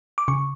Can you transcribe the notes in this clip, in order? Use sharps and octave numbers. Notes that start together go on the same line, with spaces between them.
D6
C#3 C#6